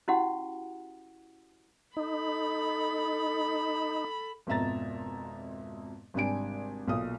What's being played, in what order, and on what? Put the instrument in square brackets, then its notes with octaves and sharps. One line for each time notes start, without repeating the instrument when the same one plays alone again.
[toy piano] C#4 E4 F#4 G4 F#5
[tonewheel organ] D#4 [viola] A4 B5
[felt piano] G#1 F2 B2 E5 A#5 A6
G#1 C3 G3 D4 G#5 D7
B1 A#2 D#6